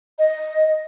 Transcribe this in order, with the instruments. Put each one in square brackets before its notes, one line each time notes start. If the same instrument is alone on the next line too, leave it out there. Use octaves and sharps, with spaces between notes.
[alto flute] D#5